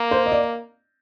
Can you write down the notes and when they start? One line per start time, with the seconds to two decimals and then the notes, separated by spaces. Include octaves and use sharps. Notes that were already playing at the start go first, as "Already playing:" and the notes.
Already playing: A#3
0.11 C5
0.26 D#5
0.32 D5